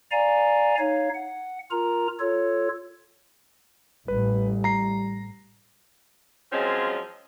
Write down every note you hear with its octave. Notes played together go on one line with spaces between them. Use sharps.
D5 F5 G#5 A#5
D#4 C#5 F5
F#5
F4 A#4 A#5
F4 A4 C#5
A1 G3 B4
A#5 C7
F3 F#3 G#3 C4 C#4 F4